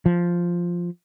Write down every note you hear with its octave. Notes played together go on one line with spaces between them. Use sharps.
F3